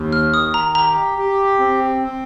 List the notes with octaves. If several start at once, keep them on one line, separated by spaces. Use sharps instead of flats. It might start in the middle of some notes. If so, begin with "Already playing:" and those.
Already playing: D#2
F6
D#3 D#6
A#5
G4 A#5
G4
C4
C4